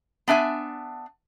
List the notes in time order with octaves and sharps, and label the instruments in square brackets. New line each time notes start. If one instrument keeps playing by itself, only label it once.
[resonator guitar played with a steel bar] B3 D4 E5 G#5